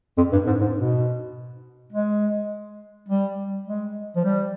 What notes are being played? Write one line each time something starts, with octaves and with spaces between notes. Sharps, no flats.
F2
G2
G#2
G#2
B2
G#3
G3
G#3
F3
G3